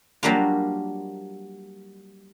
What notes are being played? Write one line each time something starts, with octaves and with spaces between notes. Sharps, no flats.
F#3 G3 A#3 D4 F4